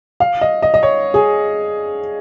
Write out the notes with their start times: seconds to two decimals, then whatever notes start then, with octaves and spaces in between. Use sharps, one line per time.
0.20 F5
0.41 D#5
0.62 D#5
0.74 D#5
0.83 C#5
1.14 G#4